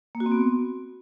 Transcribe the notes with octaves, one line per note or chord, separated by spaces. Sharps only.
A#3
F#4
C4
B3